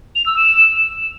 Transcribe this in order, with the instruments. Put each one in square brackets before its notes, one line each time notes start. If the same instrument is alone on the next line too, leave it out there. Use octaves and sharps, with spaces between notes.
[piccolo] F7
E6
E7